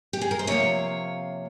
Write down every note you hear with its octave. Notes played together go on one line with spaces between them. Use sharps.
G4
G#4
A#4
C5
C3 F3 A#3 C#5